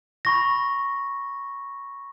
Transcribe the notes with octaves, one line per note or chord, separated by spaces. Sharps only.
B5 C#6 A#6